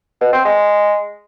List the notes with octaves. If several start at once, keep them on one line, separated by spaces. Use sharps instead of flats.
B2
C4
G#3